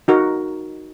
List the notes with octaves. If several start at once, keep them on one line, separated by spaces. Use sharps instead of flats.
D#4 F#4 A#4